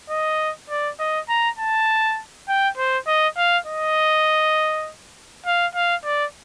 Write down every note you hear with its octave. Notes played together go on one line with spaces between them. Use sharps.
D#5
D5
D#5
A#5
A5
G5
C5
D#5
F5
D#5
F5
F5
D5